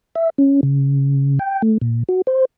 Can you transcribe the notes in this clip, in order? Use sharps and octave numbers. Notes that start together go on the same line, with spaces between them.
E5
C#4
C#3
G5
A3
A#2
F#4
C5